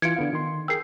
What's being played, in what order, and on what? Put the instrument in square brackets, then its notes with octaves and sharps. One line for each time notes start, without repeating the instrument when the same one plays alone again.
[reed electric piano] E3 F4 [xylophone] G#6 C#7 D7
[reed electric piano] D3 B3 F5
D#3 C6
[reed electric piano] G#4 A#4 G5 [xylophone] E6 G6 C7